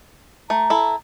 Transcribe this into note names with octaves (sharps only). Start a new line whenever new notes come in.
A3 A#5
E4 A4